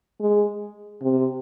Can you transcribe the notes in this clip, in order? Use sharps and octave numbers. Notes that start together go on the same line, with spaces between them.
G#3
C3